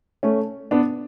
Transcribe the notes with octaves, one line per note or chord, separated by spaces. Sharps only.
A3 C#4
B3 D4